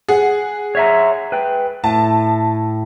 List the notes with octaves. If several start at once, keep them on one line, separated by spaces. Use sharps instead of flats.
G#4 F#5
C#5 E5 A#5
B4 G5
A2 A5